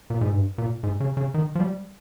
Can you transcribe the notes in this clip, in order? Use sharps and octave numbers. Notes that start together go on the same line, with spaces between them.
A#2
G#2
G2
A#2
G#2
C#3
C#3
D#3
F3
G3